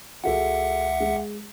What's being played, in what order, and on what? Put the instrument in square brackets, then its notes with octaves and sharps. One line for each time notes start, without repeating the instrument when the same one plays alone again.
[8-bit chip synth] C#2 E5 F#5 [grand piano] F#4 G#4 A4
[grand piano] G#3